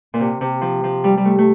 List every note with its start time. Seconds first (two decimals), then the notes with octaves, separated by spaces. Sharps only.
0.14 A#2
0.20 C3
0.41 C3
0.61 F3
0.84 F3
1.04 G3
1.17 G3
1.25 A3
1.38 A3